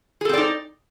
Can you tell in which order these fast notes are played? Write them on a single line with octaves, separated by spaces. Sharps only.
G#4 A4 C4 D5 D#4